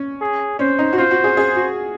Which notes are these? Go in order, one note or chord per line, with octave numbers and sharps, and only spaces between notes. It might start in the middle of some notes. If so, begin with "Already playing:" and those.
Already playing: C#4
G#4
C#4 C5
D#4
F#4
F4 C5
F#4
G#4
G#4
F#4